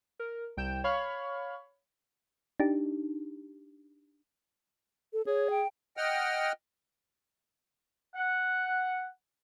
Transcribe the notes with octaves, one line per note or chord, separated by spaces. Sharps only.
A#4
C2 G5 G6 E7
C#5 F5 B5 C#6 F6
D4 D#4 G4
A4
G#4 C#5
G5
D#5 F#5 G5 F6
F#5